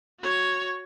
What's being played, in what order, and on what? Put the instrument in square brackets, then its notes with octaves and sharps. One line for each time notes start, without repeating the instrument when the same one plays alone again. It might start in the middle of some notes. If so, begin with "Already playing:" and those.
[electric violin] F#4 C#5